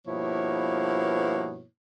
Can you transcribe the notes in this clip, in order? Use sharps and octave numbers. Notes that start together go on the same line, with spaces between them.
G2 B2 F3 A#3 E4 C#5